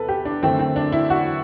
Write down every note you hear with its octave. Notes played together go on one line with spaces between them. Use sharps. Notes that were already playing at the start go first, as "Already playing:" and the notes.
Already playing: E2 C3 A4 B4
G4
D4
F#2 D3 A3 C4
C4
D4
E4
F#4